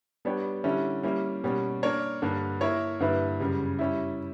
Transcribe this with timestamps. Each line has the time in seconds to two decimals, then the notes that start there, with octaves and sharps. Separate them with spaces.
0.25 G3 B3 D4 G4 C#5
0.64 D3 G3 C#4 E4
1.03 G3 A#3 C#4 E4
1.44 B2 G3 A#3 C#4
1.82 A#3 D4 A#4 C#5
2.22 G2 D3 A#3
2.61 A#3 E4 A#4 C#5
3.00 G2 D3 A#3 E4 B4
3.40 F#2 C#3 G3
3.79 G3 C#4 E4